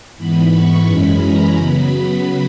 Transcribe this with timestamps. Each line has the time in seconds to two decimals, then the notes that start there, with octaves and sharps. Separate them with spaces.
0.17 G#2 E3 B3 B5
0.52 C#6
0.85 F#2 E3 G#3 C#4 B5
1.20 A#5
1.55 C#3 F#3 B3 B5